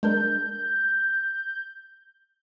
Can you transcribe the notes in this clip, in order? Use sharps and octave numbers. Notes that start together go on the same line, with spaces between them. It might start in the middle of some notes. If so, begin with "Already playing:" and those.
G#3 D4 A#4 G6